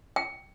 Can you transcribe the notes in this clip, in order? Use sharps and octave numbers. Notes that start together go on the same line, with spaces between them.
G5